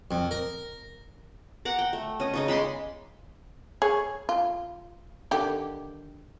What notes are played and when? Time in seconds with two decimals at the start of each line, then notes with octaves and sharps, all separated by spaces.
0.11 F2
0.31 A#4
1.65 F#5 A#5 D6
1.79 G5
1.93 A3
2.20 C#4 D#5
2.34 C#3 D#4 D#5
2.48 G#3 B5 C6 D6
3.82 G#4 C#5
4.29 F4
5.31 D3 D#3 G4